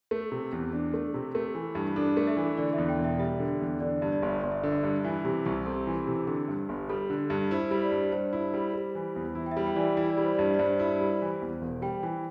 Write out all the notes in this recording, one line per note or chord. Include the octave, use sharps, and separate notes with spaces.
A3
C3
E2
D4
A3
C3
A3
E3
G2
D4 A4
A3
E5
E3
D3 D5
E5
E2
G5
E1
E5
G3 E5
D3
E2
D3 D5
G2
D5
G1 E5
G1 D5
E5
D3
G2
E3 E5
C3 G4
C2 G4
C4 A4
E3
C3
D3 G4
G2
G1
G3 A4
D3
G2
E4 C5
G3
D5
G2
G2 C5
E4
G3
G3
E3
E2
E4
G5
E5
G3
G5
E3 D5
E5
E4 E5
D5
G3
C5
G2 D5
D5
G2 C5
E4
G3
E3
E2
E1
G3 G5
E3